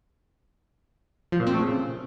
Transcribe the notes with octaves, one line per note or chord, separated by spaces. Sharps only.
F3
A#2
C4
A3
C#3